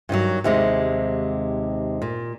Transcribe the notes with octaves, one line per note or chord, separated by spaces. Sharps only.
G2 D#3 F3 F#3
D#2 C3 G#3
A#2